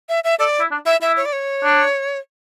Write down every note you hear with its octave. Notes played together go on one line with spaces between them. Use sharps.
E5
E5
A4 D5
E4
D4
E4 E5
E4 E5
C#5
D5
C#5
D4